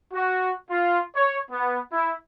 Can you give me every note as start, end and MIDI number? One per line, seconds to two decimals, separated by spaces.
0.13 0.51 66
0.70 1.00 65
1.16 1.37 73
1.51 1.79 59
1.92 2.13 64